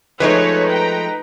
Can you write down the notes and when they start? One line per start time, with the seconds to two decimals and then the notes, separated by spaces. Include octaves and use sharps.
0.20 F3 G#3 A3 D#4 B4 C#5
0.69 G5 A#5